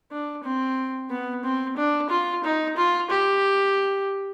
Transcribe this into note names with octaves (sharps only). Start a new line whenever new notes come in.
D4
C4
B3
C4
D4
F4
D#4
F4
G4